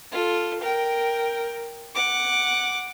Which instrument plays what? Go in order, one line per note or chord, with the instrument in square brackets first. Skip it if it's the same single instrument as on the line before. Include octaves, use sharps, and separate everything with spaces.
[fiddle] F4 A4
A#4 G5
F#5 D6